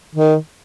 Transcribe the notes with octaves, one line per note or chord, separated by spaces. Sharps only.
D#3